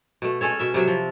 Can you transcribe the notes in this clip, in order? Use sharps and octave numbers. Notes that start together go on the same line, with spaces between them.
B2 A3
G#3 C#4 A4 C#5
B2 E5
C3 F#3 E5
F3